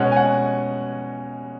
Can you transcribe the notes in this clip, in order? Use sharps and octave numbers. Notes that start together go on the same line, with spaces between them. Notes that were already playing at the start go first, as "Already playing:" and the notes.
Already playing: B2 G#3 C#4 F#5
G#5
F#5